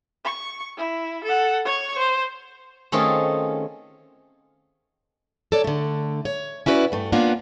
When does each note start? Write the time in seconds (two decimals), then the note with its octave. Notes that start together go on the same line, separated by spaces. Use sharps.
0.25 C#6
0.77 E4
1.24 A4 F#5
1.65 C#5 C#6
1.98 C5
2.92 D#3 A3 C4 C#4 F4 G#4
5.52 A4 C#5 D5
5.64 D3 A3
6.25 C#5
6.66 C#4 E4 F#4 B4 D5
6.92 G2 A3
7.12 A#3 B3 C#4 D4 F4 F#5